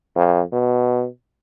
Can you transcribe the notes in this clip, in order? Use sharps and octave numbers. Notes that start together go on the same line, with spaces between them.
F2
B2